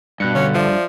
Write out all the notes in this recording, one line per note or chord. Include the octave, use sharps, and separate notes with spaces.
G2 B2 F#6 C#7
D3 C#4
F3 D5 E5